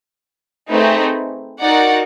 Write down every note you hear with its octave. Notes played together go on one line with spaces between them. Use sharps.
A3 C4 D#4 G#4 B4
D#4 F#4 A#4 D5 F#5